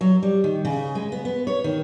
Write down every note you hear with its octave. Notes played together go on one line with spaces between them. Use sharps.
F#3
G3
D#3
C#3
G#3
B3
B3
C#5
D#3